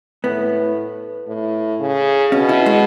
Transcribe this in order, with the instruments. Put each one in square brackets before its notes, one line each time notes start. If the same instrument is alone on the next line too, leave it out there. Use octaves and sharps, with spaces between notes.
[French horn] A2 [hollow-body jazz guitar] B3
[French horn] A2
C#3
[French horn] B2 [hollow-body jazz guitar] C#4
[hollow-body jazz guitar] E4
G#3